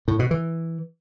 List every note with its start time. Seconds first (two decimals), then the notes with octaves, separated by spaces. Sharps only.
0.08 A2
0.19 B2
0.31 E3